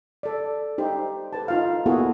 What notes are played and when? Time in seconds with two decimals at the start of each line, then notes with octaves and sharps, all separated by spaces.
0.23 A4 D5
0.78 D#4 G4 C5
1.33 A4 B4 A5
1.48 D#4 F4 F5
1.86 A#3 B3 E4 F#4 G#4 A4